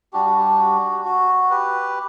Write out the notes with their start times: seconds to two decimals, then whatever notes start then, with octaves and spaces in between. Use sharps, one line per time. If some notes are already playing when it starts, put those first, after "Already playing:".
0.13 G3 D4 F#4 G4
0.25 F#4
0.38 G4
0.59 F#4
1.05 F#4
1.51 G4 B4